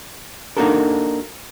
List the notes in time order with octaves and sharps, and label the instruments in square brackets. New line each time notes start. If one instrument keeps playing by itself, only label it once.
[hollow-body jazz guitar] A#3 D4 D#4 F#4 A4 A#4